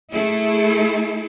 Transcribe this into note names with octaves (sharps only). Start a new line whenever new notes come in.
A3 E4 G#4 A4